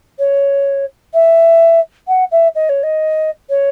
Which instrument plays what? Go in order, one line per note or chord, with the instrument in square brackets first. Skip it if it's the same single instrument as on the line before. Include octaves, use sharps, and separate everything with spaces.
[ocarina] C#5
E5
F#5
E5
D#5
C#5
D#5
C#5